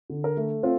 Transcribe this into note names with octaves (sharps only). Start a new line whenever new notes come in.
D3
A#4
A3
C4 F4